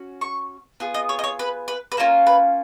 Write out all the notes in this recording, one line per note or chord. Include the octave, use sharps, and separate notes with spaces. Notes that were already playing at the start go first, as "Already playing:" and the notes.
Already playing: C#4 F#4
C#6
B3 F4 G#4
D#5
C#5
D#5
C#5
B4
B4
B4
A#3 C#4 F4 A#4
B4